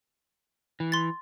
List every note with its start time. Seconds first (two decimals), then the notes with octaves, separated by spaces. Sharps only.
0.80 E3
0.92 C6 A6